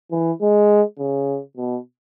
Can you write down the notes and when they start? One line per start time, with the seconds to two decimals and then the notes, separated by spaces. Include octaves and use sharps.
0.11 E3
0.42 G#3
0.99 C#3
1.57 B2